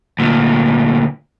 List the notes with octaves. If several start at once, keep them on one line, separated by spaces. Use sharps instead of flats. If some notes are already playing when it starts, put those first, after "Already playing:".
D2 A#2